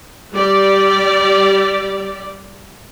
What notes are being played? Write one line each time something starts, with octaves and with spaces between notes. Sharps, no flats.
G3 G4 D5